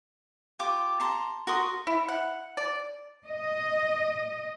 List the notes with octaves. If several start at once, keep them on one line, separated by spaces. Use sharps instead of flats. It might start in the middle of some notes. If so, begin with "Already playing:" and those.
F4 G4 D6
A5 A#5 C6
F#4 A#4 C6 D#6
E4
F#5
D5
D#5